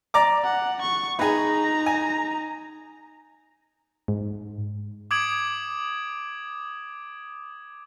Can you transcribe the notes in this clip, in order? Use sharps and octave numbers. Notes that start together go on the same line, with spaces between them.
D5 A#5 D6
F#5
C#6
D#4 G#4 B4 A#5
G#5
G#2
D6 D#6 G#6 D7 F#7